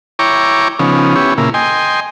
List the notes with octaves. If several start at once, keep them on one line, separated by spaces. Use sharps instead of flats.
E4 C#5 G5 A#5 C#6 D6
C#3 F3 B3 C#4 D#4
B3 C#4 E4 G4 C#5
A#2 C#3 A#3 E4
D#5 G5 G#5 C6